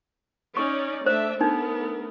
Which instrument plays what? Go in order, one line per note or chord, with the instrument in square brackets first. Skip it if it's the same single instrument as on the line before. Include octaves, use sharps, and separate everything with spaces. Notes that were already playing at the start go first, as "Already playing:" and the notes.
[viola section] C#4 D#4 D5 [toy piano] C#6
[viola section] A3 D4 E5 [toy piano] C5
[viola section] A3 B3 A#4 [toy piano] D4 D#4